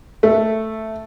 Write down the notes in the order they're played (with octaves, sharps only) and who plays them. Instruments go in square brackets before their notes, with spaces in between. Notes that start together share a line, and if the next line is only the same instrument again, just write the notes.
[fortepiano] A3